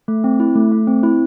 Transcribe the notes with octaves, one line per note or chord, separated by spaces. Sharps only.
A3
C4
E4
A3
A3
C4
E4